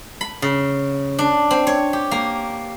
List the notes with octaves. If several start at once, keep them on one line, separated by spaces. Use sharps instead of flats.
B5
C#3
D4
C4
C#5
G4
A#3